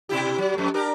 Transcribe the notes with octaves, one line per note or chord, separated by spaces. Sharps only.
B2 E4 G4
F#3
F2 A3
D4 G4 A#4